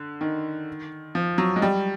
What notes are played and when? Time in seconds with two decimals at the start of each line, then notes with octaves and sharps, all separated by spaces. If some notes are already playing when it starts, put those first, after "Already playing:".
Already playing: D3
0.21 D#3
1.15 F3
1.38 F#3
1.56 G#3
1.62 G3